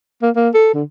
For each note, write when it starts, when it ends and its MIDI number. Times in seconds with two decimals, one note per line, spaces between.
0.22 0.30 58
0.36 0.49 58
0.54 0.71 69
0.74 0.83 50